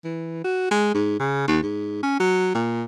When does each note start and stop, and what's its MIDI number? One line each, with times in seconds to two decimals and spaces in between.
0.05 0.42 52
0.44 0.67 66
0.71 0.90 56
0.94 1.18 44
1.20 1.45 49
1.48 1.61 39
1.63 1.98 44
2.03 2.17 61
2.20 2.52 54
2.55 2.84 46